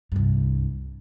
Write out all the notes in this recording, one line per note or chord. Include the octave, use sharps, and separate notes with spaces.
C2 G2